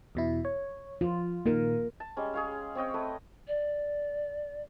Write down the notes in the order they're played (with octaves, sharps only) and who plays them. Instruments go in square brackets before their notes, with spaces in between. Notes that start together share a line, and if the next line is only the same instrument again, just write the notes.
[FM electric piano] E2 B2 E4
C#5
[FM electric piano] F3 [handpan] F4
[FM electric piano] A#2 D#3 [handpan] A#3 A#4
[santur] A5
G3 G#3 C#4
G#4 C#5 F5
C4 C#5 D#5 G5
A3 B4
[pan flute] D5